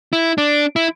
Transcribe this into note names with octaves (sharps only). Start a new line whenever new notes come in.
E4
D4
E4